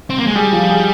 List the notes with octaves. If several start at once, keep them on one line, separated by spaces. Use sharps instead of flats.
C4
A#3
G#3
G3 G#4
F3
G#4